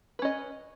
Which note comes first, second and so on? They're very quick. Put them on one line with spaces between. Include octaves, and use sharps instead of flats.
B4 C#4 D#5